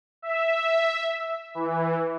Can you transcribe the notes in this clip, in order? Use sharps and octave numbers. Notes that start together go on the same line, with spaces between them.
E5
E3